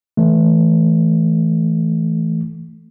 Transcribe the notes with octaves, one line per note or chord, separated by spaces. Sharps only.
E3 A3